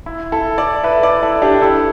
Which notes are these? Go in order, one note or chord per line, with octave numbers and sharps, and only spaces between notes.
E4
E4 A4
A4 D5
B4 E5
A4 D5
E4 A4
D4 G4
E4 A4